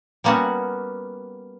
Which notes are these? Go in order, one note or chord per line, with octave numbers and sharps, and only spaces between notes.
G3 A#3 B3 C#4 F#4